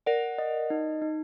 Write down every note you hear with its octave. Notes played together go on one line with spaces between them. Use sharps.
A#4 D5 F#5
D#5
D#4
D#4